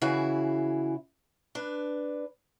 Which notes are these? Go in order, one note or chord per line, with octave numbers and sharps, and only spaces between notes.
C#3 E3 E4 F#4 G#4
D4 B4